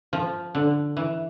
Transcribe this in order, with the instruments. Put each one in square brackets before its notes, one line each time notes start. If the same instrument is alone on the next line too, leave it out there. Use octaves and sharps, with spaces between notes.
[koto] F3
D3
E3